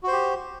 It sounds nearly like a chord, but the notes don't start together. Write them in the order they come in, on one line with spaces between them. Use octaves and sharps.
F#4 C5 G4